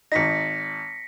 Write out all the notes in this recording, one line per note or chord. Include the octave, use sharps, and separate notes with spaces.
G#1 D#4 A#6 B6 C#7